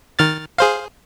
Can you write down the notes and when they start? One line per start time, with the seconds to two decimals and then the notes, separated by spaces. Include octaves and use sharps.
0.19 D#3 F6 A6
0.58 G#4 C5 F5